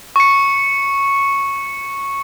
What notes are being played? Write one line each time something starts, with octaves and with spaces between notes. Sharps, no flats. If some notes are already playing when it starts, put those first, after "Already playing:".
C#6 C#7